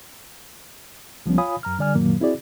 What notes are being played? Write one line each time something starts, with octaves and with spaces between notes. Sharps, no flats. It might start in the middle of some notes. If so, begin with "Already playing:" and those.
C#2 F3 G3 B3 C#4
F4 C#5 F5 G#5 B5 D#6
F#2 A#5 F6
D3 G3 D5 G#5 F6
F#2 A#2 D#3 F#3 A#3
C4 E4 F#4 G#4 D5